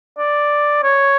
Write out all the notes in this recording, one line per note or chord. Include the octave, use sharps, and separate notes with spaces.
D5
C#5